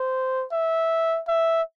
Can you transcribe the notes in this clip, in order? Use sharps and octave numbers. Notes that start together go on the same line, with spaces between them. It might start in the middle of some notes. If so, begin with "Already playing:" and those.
Already playing: C5
E5
E5